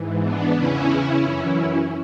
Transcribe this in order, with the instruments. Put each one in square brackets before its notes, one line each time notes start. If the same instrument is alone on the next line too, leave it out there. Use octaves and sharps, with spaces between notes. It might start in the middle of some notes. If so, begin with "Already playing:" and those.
Already playing: [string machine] G#2 E3
B3 D4
E2 C#3 E3 C#4 E4
F#2 E3